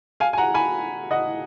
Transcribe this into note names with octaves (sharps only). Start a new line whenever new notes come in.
F5 G#5
G#5
F#5 A#5
G#5 B5
D#5 F#5